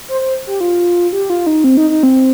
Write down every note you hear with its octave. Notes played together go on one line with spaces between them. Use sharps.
C5
C5
G4
F4
G4
F4
D#4
C4
D#4
D#4
C4